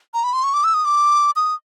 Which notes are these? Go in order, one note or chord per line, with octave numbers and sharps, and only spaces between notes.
A#5
B5
C6
C#6
D6
E6
D#6
D6
D#6